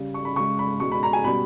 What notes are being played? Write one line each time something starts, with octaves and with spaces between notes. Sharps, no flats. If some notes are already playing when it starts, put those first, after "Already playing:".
Already playing: C#3 G3
C#6
B5
C#3 G#3 C#6
B5
B2 G#3 C#6
B5
A#5
G#5
B2 G3 B5